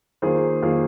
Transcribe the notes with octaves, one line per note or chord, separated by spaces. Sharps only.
D#3 A#3 F4 G#4 C5
D#3 A#3 F4 G#4 C5